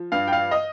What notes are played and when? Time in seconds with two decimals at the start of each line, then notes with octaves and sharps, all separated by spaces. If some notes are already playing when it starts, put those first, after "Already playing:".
Already playing: F3
0.12 G2 F5
0.28 G5
0.32 F5
0.51 D#5